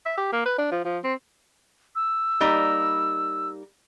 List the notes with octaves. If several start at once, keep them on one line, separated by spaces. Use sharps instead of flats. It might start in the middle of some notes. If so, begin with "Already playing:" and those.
E5
G4
A#3
B4
D4
F3
F3
C4
E6
G3 A#3 D#4